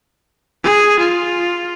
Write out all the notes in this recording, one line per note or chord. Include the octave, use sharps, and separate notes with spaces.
G#4
F4